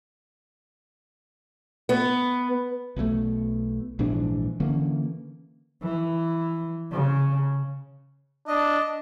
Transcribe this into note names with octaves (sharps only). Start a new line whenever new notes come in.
B3
B1 B2 E3 A3
A#1 G#2 E3 D4
D3 E3 A#3 C#4
E3
C#3
D4 D#5